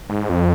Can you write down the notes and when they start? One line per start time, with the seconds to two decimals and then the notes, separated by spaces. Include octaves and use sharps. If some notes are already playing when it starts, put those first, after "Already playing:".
0.10 G#2
0.29 F2